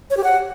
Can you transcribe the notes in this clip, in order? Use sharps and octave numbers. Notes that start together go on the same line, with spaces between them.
C#5
G4
F#5